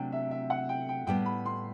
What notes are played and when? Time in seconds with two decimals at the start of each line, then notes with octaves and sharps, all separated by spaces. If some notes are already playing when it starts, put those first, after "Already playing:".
Already playing: C3 F#3 A3 D4 G5
0.12 E5
0.31 E5
0.50 F#5
0.69 G5
0.89 G5
1.07 A2 G3 B3 G5
1.26 B5
1.46 C6